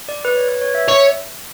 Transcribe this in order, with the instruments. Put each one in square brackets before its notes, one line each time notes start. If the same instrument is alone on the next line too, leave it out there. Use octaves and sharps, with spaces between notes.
[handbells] D5
B4
C#5
B4
C#5
E5
[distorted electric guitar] C#5